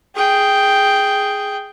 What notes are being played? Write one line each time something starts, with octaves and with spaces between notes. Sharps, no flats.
G#4 G5